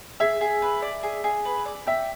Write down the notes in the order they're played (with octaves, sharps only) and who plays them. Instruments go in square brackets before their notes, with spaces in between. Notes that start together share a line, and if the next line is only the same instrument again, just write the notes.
[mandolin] G#4 [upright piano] E5
[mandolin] G#4
B4
D5
G#4
G#4
B4
D5
[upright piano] E5 [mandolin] G5